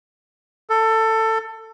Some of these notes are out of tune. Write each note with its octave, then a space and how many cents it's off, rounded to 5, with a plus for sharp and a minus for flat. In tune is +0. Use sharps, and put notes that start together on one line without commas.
A4 +20